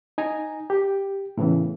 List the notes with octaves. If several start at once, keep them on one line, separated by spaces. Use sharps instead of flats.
D#4 G#5 A#5
G4
A2 C#3 E3 B3